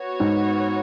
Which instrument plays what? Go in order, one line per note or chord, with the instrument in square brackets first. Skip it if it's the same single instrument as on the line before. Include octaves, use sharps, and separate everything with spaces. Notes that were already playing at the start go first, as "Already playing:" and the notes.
Already playing: [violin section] B3 F#4 C#5
[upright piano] G#2